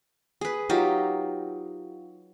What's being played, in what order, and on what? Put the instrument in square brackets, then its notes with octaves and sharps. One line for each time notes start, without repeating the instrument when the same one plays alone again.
[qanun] G#4 B4
F#3 D#4 F4 G4